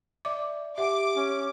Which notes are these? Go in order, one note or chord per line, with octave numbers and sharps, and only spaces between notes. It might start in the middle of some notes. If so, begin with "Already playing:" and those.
D5 E5 D6
G4 E5 F#5 G#5 D6
C#4